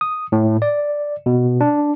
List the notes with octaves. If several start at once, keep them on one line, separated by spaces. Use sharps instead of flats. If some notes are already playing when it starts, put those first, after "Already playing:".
D#6
A2
D5
B2
D4